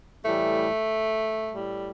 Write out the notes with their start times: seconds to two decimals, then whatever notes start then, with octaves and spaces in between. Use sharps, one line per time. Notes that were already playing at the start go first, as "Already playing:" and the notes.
0.25 A2 E3 G3 A3
1.50 A2 G3